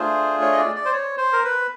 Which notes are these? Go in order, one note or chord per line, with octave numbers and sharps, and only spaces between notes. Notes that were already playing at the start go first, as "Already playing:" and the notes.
Already playing: A3 D4 F4 G#4 C5
C#5
D#5
D5
D5
C5
C#5
C5
A#4
B4